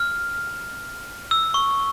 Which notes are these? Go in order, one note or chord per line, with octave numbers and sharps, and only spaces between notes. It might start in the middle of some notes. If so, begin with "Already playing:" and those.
Already playing: F6
E6
C#6